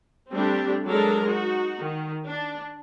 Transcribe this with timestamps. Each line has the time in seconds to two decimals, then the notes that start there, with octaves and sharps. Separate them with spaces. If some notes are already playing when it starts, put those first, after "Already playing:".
0.32 G3 A3 C4 D4 G4
0.88 F#3 G#3 D4 A4 A#4
1.25 D#4 F#4
1.81 D#3
2.26 D4